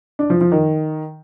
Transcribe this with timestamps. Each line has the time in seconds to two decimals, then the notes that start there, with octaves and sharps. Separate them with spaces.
0.19 D4
0.30 F3
0.41 F3
0.52 D#3